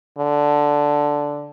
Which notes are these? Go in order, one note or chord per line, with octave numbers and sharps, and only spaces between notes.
D3